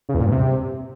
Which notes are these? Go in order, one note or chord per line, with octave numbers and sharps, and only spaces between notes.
C#3
E2
A#2
G2
C3